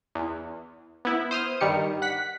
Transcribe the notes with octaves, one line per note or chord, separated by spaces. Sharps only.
E2
B3 E4
C5 D#6 F6
G2 D#3 G3 C#7
F#5 B6